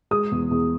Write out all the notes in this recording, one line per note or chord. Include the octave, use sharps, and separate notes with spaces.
G#3 D#6
E2
E2